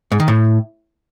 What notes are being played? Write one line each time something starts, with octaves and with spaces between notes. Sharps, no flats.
G#2
D#3
A2